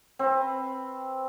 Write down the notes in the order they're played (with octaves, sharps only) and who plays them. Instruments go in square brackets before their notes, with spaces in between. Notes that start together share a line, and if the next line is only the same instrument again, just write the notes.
[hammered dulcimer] C4 B4